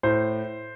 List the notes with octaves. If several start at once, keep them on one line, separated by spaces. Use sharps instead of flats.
A2 C5